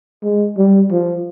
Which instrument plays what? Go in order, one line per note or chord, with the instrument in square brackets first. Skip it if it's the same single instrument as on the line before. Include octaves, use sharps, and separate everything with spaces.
[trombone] G#3
G3
F3